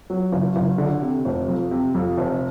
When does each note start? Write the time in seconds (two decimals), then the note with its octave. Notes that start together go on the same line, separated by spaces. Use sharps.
0.10 F#3
0.32 F#1
0.56 F#1
0.78 D3
1.02 C3
1.25 F1
1.48 F2
1.71 C3
1.95 F2
2.18 F1